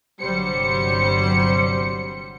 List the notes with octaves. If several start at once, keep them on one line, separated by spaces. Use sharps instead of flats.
G1 C3 F#3 G3 C5 C#7